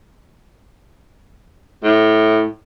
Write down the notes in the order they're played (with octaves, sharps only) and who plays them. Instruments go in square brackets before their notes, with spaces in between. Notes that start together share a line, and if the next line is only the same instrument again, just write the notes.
[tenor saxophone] A2